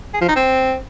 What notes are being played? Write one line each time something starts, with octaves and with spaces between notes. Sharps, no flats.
G#4
F3
D#4
C4